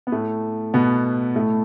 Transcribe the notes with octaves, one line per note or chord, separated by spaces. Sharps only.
B3
A2 A3
B2 B3
A2 A3